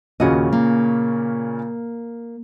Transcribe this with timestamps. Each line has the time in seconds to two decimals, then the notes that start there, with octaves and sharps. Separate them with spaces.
0.20 D#2 A#2 C#3 C#4 F#4 D#5
0.53 A#3